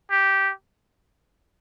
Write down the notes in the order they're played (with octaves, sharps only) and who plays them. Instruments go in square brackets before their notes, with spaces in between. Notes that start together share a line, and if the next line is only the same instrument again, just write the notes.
[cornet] G4